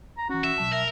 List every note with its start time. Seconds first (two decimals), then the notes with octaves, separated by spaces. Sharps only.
0.18 A#5
0.29 E3 C#4 F#4
0.44 E5
0.58 B2 F#3 A5
0.71 A#4 E5